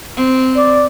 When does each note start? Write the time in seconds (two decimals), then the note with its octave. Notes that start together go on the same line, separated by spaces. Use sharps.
0.16 C4
0.55 D5